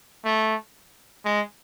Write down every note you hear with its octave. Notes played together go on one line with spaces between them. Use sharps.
A3
G#3